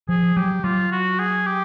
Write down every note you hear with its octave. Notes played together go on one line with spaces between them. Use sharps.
F3 G#4
F#3 G4
F#3 F4
F#4
G#4
G4